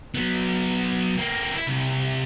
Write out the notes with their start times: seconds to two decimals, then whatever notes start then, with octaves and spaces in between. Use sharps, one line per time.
0.14 F#3 B3
1.18 A#3 C4
1.55 E4
1.68 C2